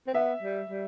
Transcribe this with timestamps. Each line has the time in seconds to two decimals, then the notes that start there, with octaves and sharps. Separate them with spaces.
0.07 C4
0.14 B3 E5
0.43 G3
0.70 G3